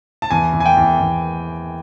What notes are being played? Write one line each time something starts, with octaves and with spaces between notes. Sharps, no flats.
A5
E2 G#5
E2
G#5
G5
E2
E2